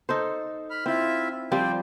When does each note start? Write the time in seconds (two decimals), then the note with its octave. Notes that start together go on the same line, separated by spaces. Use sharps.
0.09 D#4 A4 C5
0.70 B5 F6
0.86 C4 E4 F4 E5 F5
1.52 F3 G3 C4 C5 D5 G5